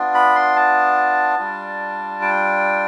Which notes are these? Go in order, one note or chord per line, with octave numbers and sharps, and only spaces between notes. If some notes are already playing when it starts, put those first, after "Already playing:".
Already playing: B3 D4 F4
B5
C6
A5
G3 D4 F4
G5